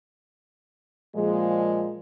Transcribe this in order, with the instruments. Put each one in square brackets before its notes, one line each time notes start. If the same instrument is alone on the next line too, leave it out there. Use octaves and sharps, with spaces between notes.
[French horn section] A#2 F3 G#3